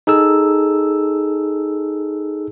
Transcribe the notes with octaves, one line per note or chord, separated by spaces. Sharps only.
D#4 G#4 A4 E6